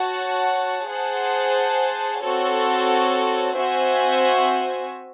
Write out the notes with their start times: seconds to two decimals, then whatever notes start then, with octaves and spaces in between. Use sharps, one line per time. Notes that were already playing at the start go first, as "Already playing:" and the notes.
Already playing: F#4 C#5 F#5 A5
0.89 G#4 C5 F#5 A5
2.22 C4 F#4 A4 C#5
3.55 C4 F#4 C5 E5 G#5